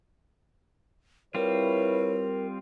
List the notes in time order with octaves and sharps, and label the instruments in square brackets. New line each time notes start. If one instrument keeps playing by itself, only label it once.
[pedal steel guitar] G3 C4 F4 [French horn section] E4 B4 C#5 [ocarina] A#4